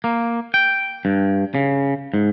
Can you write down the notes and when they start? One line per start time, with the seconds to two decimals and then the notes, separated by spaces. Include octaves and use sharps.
0.04 A#3
0.54 G5
1.05 G2
1.55 C#3
2.14 G#2